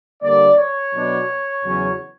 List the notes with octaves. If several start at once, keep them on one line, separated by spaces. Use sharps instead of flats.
D3 G3 A#3 D5
C#5
B2 F#3 B3 D4
E2 C#3 F#3 C#4